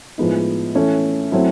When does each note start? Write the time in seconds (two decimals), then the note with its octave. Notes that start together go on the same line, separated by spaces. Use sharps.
0.18 A2 F3 G#3 B3 D#4
0.74 E3 A3 C#4
1.32 F#3 A3 C4 E4